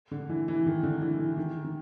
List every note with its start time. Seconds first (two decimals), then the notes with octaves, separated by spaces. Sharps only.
0.11 D3
0.29 E3
0.48 E3
0.66 D#3
0.83 D3
1.02 E3
1.19 E3
1.37 D#3
1.64 D#3